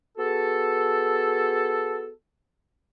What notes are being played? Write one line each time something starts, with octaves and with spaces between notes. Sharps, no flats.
B3 F#4 G#4 A4